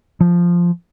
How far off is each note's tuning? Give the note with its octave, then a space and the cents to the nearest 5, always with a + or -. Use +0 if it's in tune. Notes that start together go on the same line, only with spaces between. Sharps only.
F3 -5